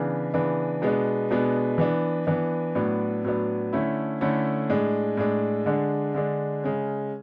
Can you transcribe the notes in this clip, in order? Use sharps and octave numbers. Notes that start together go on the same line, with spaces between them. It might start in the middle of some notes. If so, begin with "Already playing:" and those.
Already playing: C#3 E3 B3 D4
C#3 E3 B3 D4
B2 G#3 B3 D4
B2 G#3 B3 D4
E3 B3 D4
E3 B3 D4
A2 F#3 B3 D4
A2 F#3 B3 D4
D3 A3 C#4 E4
D3 A3 C#4 E4
A2 G#3 D4
A2 G#3 D4
D3 G#3 D4
D3 G#3 D4
C#3 G#3 C#4